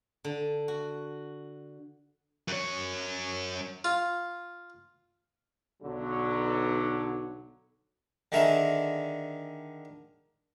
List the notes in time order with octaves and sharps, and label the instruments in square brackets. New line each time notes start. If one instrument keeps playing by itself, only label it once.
[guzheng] D3
F#4
[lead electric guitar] F#2 C#5
[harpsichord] F4
[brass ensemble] B1 D3 F#3
[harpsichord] D3 D#3 G#4 E5 A#5